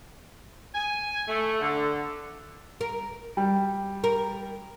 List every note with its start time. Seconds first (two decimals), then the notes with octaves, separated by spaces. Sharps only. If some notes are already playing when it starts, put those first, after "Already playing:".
0.75 G#5
1.28 A3
1.61 D3
2.81 A#4
3.37 G3
4.04 A#4